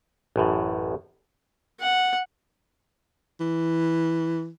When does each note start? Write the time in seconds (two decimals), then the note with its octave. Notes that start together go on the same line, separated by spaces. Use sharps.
0.36 A1 F#2 A2
1.80 F#5
3.40 E3